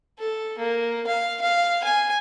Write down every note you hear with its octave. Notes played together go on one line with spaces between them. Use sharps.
A4
A#3
F5
F5
G#5